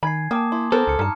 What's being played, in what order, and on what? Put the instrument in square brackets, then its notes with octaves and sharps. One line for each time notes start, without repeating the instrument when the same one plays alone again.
[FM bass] D#3 [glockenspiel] G#5 G#6 C7 [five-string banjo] B5
[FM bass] A#3 [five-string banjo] G5 [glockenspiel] A5 D6 D#6
[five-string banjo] E4 [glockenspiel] C6
[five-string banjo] D#3 A#4 C5 [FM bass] B3 [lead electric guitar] A4 [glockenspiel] F6
[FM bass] C#2 [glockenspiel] F6 C#7
[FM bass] G2 [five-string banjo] D#4 A5 [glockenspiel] F6